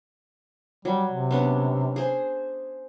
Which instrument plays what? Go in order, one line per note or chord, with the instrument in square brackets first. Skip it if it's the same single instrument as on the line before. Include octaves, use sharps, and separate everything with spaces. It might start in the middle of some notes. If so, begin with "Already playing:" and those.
[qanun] F#3 [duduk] G3
[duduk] C3
[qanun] B3 C#4 D4
G#4 C5